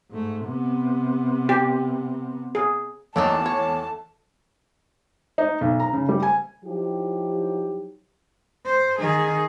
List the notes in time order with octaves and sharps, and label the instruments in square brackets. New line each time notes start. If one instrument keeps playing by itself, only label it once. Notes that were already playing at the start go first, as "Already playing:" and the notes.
[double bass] G#2 A3
C3 B3
[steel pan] G4
G#4
[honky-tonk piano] E2 [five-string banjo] D#3 F#3 D4 [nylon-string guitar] A3 [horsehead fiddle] A5
[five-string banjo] C#5
[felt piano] D#4
B1
A#5
C#3
G3
G#5
[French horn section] F3 F#3 D#4 E4 G4
[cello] C5
D#3 G#4